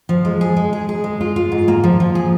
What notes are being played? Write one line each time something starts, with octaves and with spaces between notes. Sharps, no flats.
F3
G#3
G#4
G#3
G#4
G#4
G#3
F4
F4
G#2
A#3
F3
F3
G#4